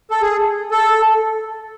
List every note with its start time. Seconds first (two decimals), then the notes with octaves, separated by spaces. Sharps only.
0.11 A4
0.22 G#4
0.71 A4